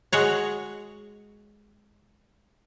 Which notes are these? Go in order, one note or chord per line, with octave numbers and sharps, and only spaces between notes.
G#3 F#4 C#5